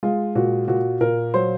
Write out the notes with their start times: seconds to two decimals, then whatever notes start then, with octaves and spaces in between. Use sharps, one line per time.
0.03 G#3 F4
0.35 A#2 F#4
0.68 A#2 F#4
1.01 A#2 A#4
1.34 F#3 C5